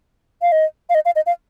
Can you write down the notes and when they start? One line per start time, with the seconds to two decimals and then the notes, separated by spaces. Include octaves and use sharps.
0.42 F5
0.52 D#5
0.90 F5
0.95 D#5
1.05 F5
1.16 D#5
1.26 F5